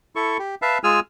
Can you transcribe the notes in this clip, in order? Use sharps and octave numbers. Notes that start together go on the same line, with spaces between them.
E4 A4 C#6
G4
B4 E5 F5 A5
G#3 F4 G#4 G#5 E6 F6